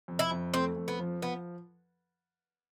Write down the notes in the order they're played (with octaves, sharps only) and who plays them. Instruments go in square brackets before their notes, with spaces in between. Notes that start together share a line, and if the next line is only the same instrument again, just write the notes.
[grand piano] F2
[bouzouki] E4
[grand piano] F2
[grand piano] A3 [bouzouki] C4
[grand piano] F2
[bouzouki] B3
[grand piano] F3
[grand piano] F3 [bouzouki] B3